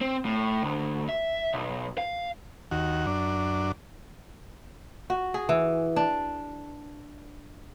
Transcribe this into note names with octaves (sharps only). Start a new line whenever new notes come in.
C4
A2
D2
E5
B1
F5
D#2 F#4
F#2 D4
F#4
G#4
E3
D4